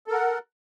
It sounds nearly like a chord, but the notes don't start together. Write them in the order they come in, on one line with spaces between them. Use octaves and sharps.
A4 A#4 F#5